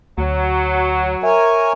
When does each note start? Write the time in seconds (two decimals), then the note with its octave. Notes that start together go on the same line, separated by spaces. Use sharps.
0.18 D2 F#3
1.23 A#4 C#5 E5 G#5